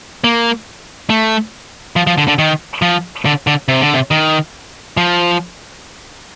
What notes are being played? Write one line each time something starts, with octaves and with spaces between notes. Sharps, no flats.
A#3
A3
F3
F3
D3
D3
D#3
F3
D3
D3
C3
D3
C3
D#3
F3